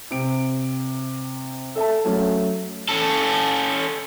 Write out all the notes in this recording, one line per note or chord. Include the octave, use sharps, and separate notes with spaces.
C3 D7
A4 E5 A5
F#3 A3 C#4
C#4 A4